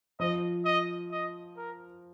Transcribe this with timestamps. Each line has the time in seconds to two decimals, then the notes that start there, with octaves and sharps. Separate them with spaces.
0.20 F3 D#5
0.65 D#5
1.11 D#5
1.57 A#4